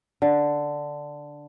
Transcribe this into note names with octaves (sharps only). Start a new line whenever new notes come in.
D3